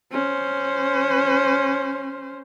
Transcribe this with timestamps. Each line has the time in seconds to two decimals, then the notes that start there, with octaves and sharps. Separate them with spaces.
0.11 C#4 C5